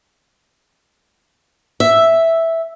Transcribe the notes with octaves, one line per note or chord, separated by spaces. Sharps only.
E5